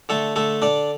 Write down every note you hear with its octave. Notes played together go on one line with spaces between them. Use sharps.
D3 A3 A4
D3 A3 A4
D3 D4 D5